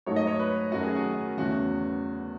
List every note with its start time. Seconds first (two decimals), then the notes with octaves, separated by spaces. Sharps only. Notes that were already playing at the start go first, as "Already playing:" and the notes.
0.06 G#2 F#3 A3 D#4 F#4 C#5
0.16 D#5
0.27 C#5
0.39 B4
0.72 F#2 D#3 A3 C#4 F#4
0.83 G#4
0.96 F#4
1.37 E2 C#3 E3 A3 C#4 F#4